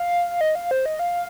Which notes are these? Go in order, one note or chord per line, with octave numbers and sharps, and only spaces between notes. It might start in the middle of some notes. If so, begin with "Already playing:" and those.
Already playing: F5
D#5
F5
C5
D#5
F5